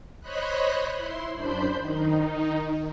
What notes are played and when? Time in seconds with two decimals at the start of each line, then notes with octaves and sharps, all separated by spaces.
0.21 C5 C#5 D#5 B5 F#6
0.97 E4 C6
1.34 F#2 D4 C5 B5 C6 G6
1.79 D#3 D#4